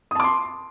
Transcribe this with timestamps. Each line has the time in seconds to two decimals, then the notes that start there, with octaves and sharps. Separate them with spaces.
0.11 D#6
0.15 A5
0.20 D6
0.24 C6